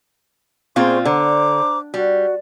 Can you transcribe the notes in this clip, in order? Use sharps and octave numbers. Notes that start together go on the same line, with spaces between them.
A#2 C4 F4 G#4 C5 C#6
D3 C5 A#5 D6
G3 F#4